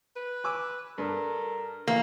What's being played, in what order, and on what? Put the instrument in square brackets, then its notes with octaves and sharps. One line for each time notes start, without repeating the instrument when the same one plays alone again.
[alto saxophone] B4
[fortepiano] G#5 D6 E6
[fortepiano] G2 [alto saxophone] A4 [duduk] A#4
[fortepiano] A#1 E3 F5 [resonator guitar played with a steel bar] A#3